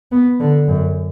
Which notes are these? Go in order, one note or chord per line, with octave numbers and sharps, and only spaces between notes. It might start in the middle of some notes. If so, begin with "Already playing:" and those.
B3
D3
F#2